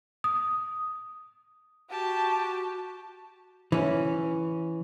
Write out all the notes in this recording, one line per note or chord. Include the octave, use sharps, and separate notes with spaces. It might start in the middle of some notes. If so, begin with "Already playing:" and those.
D#6
F#4 G4 A5
E3 C#4